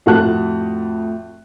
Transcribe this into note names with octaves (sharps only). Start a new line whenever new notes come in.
F2 A2 F#4 E5 A5 F#6